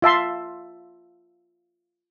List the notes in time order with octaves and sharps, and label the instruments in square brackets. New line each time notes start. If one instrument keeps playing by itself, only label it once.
[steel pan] F4 E5 A5 C6